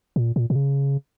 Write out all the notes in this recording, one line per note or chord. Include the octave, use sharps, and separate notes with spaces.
A#2
A#2
A#2
C#3